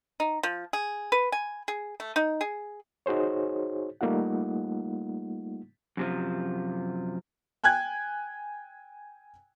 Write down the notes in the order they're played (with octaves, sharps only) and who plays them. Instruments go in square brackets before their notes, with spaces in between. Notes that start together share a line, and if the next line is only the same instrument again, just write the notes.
[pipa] D#4
F3
G#4
B4
G#5
G#4
A3
D#4
G#4
[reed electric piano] D#4 F#4 G#4 C5 C#5
G3 A3 A#3 D#4 F4 F#5
[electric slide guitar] F#2 C3 F3
[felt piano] G5 G#5 F#6 G#6